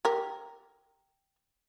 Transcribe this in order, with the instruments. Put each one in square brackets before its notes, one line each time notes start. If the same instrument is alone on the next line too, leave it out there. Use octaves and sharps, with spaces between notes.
[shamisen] G4 A#4